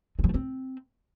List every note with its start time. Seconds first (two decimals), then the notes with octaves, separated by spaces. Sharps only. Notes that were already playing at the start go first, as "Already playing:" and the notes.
0.19 G#3
0.24 F#3
0.29 A3
0.34 C4